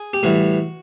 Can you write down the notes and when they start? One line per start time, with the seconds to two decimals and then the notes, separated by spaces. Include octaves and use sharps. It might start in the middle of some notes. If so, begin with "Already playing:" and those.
Already playing: G#4
0.13 G4
0.23 A2 E3 G3 F#4